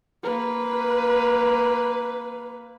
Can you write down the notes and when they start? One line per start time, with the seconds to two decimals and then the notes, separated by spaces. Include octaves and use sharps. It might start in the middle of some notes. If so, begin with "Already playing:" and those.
0.23 A#3 B4